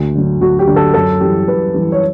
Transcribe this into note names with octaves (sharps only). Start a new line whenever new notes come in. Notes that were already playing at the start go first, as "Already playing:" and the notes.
Already playing: D2
D3 F#3
D2 F#4
G4
D3 F#3
A4
F#2 A4
E3 G3 G4
F#2 B4
E3 G3
C#5